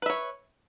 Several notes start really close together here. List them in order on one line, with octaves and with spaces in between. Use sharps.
B4 E5 C#5